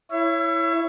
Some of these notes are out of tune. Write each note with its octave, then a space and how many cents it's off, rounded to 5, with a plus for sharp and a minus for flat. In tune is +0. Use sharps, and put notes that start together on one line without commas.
E4 +0 C#5 +0 E5 +35